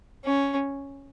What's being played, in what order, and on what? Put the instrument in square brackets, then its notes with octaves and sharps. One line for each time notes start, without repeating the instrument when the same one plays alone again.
[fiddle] C#4